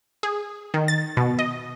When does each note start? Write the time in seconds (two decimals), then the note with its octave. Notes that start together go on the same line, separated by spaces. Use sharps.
0.23 G#4
0.74 D#3
0.88 A6
1.17 B2
1.39 D#5